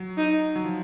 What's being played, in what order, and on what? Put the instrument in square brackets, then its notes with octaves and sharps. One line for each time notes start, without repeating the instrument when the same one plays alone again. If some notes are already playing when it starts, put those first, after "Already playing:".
Already playing: [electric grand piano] F#3
[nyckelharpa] D#4
[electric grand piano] F#3
F3